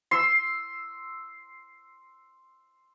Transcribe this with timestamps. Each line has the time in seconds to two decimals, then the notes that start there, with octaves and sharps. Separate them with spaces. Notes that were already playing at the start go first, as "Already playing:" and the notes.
0.11 C6 E6